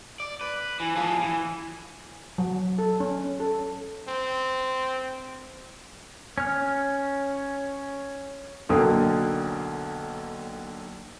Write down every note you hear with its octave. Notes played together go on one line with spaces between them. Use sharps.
D5
B4
E3
F3 G#4
E3
F#3
A4
C#4
A4
C4
C#4 F6
B1 D3 F#3 A#3 G5 D#6